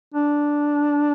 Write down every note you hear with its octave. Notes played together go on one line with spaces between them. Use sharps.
D4